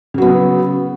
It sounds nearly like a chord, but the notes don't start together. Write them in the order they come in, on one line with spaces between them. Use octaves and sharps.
C#3 F#3 B3